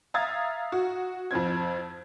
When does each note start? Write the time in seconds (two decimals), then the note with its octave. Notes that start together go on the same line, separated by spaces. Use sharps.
0.14 E5 F5 A#5 D#6 G#6 A6
0.72 F#4
1.31 F2 F3 C4 G#6